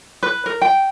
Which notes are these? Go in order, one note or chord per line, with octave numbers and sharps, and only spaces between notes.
B4
A#4
G5